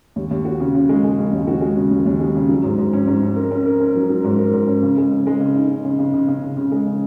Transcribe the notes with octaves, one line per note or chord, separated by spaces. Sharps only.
D#2
D#2
F#4
C#3
C#3
G#3
G#3
C#3
D#2
F#4
G#3
C#3
D#2
D#2
G#3
C#3
F#3
G#2
G#2
C#4
G#2
C#4
A#4
C#4
A#4
C#4
F#3
F#3
G#2
A#4
G#2
C#4
C#3
G#3
C#3
G#3
C#3
D#4
C#3
C#3
C#3
C#3
C#3
C#3
C#3
G#3
C#3